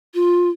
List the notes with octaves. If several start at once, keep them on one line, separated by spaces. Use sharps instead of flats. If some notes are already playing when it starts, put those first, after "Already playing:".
F4